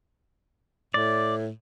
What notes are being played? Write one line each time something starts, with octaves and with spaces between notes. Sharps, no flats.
A2 D5